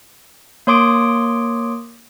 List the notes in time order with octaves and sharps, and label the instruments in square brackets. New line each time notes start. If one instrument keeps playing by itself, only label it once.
[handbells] A#3 C#5 C6 D6 D#6 D7